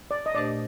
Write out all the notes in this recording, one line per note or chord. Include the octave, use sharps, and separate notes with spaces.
D5
D#5
A#2 A3 D4 G4 C5 D5